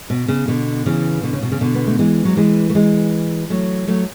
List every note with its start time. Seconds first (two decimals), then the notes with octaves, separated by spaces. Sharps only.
0.10 B2
0.28 C#3
0.48 B2 D3
0.86 C#3 E3
1.23 B2 D3
1.33 C#3
1.42 B2
1.52 C#3
1.61 B2 D3
1.74 B3
1.87 A3
1.99 E3 G#3
2.25 F#3
2.37 E3 G#3
2.70 A3
2.75 E3 G#3
3.50 F#3 A3
3.88 F#3 A3